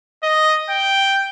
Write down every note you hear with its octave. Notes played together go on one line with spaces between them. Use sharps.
D#5
G5